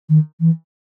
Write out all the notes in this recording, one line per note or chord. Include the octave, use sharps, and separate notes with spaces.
D#3
E3